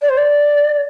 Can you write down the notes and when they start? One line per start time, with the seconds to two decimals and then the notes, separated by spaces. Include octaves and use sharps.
0.01 D5
0.09 C5
0.17 D5